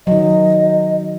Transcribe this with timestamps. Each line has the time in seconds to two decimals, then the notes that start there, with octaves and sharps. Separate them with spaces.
0.07 D#3 F#3 D#5